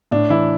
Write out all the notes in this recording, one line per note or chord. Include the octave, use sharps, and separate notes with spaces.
A2 D4
E3 E4